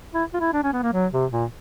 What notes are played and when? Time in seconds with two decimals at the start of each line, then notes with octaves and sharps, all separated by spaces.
0.14 E4
0.34 F4
0.40 E4
0.53 D4
0.63 C#4
0.73 B3
0.83 A#3
0.93 F#3
1.12 C3
1.31 A#2